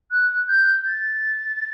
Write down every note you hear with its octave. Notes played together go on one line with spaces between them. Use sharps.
F#6
G6
A6